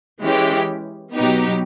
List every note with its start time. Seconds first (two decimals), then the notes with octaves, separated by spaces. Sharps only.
0.22 E3 G#3 C#4 E4 G4
1.14 B2 F#3 B3 D#4 G4